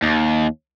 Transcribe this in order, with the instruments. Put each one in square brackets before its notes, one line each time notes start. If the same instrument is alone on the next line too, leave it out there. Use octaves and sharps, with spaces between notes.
[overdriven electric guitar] D#2